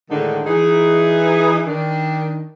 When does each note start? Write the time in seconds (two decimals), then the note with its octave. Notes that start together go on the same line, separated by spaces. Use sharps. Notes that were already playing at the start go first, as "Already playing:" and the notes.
0.10 A2 D3 D#3 G#3 D4 D#4
0.46 E3 D#4 G#4
1.67 D#3 D4